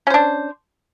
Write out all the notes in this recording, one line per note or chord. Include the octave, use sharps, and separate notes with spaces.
C#4 D4 C5